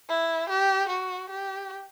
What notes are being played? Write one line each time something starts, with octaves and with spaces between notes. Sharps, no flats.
E4
G4
F#4
G4